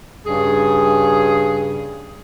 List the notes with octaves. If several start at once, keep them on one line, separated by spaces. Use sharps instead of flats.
G2 C#3 G#4